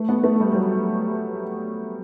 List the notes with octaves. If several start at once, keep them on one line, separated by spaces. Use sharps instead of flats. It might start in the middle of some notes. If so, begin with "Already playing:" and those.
Already playing: A3
B3
A3
G3
G3
F#3